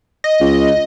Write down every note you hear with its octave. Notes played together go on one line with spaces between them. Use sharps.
D#5
C#2